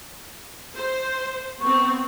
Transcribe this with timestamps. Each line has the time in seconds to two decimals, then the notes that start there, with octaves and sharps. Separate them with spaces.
0.75 C5
1.61 B3 C4 C#6